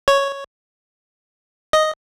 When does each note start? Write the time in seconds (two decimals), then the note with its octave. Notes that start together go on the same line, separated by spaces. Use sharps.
0.08 C#5
1.73 D#5